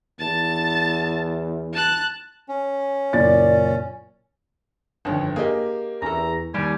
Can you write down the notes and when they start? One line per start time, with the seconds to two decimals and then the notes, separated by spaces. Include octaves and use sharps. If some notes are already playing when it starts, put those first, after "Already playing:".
0.19 E2 A5 A6
1.73 A5 F#6
2.49 C#4
3.13 F#1 A#2 D5 A6
5.05 G1 F2 D#3 C#4
5.36 A#3 G4 G#4 D#5
6.02 E2 C#4 A4 A#5
6.54 D#2 G3 G#5